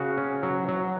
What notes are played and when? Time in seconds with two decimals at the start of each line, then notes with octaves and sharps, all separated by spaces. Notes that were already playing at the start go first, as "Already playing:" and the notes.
Already playing: C#3 F#4
0.17 C#4
0.43 F#3
0.68 F#3